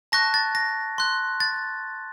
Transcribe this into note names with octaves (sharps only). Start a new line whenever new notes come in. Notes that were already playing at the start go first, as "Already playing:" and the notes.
A5 C#6 F#6 A#6
A6
A#6
C6 F#6
A6